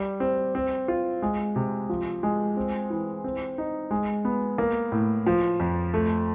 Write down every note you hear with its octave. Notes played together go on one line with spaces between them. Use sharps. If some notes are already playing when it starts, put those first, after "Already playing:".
Already playing: G3
C4
C4
F4
G#3
C3
F3
G#3
C4
E3
C4
D#4
G#3
B3
A#3
A2
F3
F2
A3